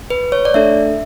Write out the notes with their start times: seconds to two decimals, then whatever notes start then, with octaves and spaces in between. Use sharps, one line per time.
0.10 B4
0.32 C#5
0.45 D5
0.54 A3 D4 A4 E5